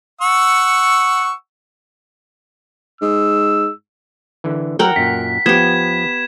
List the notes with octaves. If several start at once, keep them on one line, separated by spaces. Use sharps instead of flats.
F#5 C#6 E6
G#2 E6
D3 E3
F#3 A#4 F#5 G5
F#2 A#2 B6
F3 B3 G4 B4 G#6 E7